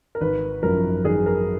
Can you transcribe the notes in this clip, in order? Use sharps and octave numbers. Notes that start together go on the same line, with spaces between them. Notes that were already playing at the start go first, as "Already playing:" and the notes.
A#4
G#1 B4
F#2 F3 A#4
G#1 G#4
A#4